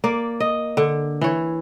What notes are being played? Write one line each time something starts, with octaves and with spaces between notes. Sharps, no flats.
A#3 D5
D#5
D3
E3 C#5